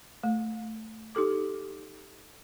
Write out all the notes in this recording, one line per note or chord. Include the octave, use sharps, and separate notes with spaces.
A3
D#4 G4 A4 D6